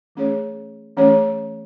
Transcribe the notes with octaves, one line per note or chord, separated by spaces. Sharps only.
E3 A3 C#4 G#4 C#5
E3 A3 C#4 G#4 C#5